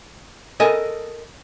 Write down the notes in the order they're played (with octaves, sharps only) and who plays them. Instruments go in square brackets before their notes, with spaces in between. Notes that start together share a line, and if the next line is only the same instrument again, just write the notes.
[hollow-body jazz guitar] A4 A#4 D#5 G#5